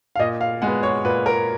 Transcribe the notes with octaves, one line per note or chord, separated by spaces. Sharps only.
F5
A#2 D#5
F5
G#3 B3 F#5
C#5
A#2 B4
A#4